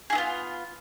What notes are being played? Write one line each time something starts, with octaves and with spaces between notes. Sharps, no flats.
B3 E4 F4 G#4